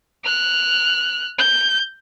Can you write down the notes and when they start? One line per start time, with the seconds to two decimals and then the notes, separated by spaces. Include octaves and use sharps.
0.25 F6 F#6
1.39 G6